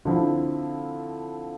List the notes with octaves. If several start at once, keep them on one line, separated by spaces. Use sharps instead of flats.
D3 F3 C4 E4